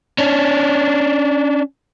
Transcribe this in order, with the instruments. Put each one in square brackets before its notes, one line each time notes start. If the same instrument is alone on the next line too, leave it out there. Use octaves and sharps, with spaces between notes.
[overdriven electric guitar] C#4 D4